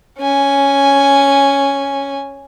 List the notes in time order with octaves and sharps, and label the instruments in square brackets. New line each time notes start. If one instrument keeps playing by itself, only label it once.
[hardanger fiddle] C#4 G#5